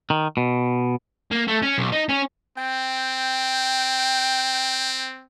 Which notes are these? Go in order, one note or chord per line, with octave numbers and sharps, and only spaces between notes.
D#3
B2
A#3
A3
C#4
B1
D#4
C#4
C4 G5